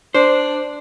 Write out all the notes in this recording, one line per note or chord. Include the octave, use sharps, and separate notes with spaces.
D4 C5